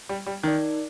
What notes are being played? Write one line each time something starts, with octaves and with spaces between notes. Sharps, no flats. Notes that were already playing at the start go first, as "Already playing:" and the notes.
G3
G3
D#3 D#4 A#4 D5